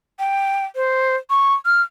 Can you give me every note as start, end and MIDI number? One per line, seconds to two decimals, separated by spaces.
0.19 0.65 79
0.76 1.16 72
1.30 1.54 85
1.66 1.82 89